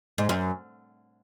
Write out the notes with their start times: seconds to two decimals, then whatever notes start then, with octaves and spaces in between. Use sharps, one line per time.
0.18 G#2
0.29 F#2